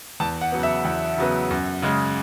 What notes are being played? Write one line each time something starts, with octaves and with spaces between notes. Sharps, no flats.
E2 A5
F#5
C#3 F#3 B3
E5
E2
C#3 F#3 B3
F#2
C#3 G#3